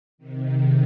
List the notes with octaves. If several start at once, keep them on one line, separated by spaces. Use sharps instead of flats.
C3 D#3